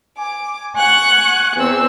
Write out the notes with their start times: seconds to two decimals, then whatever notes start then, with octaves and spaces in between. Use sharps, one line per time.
0.18 G#5 D6
0.77 F#5 G#5 C#6 F#6
1.56 E2 C4 E6